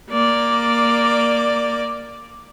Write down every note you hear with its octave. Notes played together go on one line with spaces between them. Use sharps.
A#3 D5